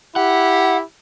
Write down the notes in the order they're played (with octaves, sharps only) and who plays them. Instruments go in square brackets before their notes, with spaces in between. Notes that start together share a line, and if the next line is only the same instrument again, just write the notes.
[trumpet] E4 [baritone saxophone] G4 [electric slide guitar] F#5